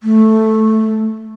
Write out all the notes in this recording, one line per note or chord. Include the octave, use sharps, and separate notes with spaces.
A3